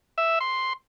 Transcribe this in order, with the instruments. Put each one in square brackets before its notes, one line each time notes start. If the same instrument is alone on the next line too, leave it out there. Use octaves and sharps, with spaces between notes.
[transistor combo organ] E5
C6